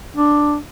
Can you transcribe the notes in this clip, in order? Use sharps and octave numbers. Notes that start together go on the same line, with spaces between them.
D4